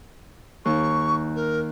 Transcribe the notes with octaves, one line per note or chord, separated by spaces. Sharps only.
D#2 C#6
A#4